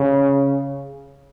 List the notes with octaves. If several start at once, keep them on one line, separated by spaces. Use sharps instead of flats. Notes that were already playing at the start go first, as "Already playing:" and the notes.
Already playing: C#3